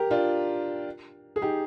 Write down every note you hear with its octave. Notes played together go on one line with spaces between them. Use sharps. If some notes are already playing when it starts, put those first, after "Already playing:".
Already playing: G4 A#4
D4 F4
G#4
D#4 G4